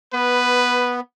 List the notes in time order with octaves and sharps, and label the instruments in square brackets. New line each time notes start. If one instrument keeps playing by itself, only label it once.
[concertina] B3 [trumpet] B4